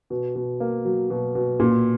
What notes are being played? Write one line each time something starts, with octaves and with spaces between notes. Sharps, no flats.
B2
B2
A#3
F#3
B2
B2
A#2